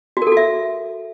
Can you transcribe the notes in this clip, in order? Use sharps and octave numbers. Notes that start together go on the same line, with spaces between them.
F#4
A#4
A4
F#4
E5